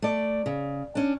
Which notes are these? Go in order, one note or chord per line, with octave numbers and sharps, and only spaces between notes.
A3 D5
C#3
C#4 D4